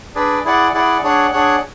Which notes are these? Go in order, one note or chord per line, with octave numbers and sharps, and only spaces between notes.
D4 G#4 B4 D5
E4 G#4 D5 F#5
E4 G#4 D5 F#5
D4 G#4 C#5 F#5
D4 G#4 C#5 F#5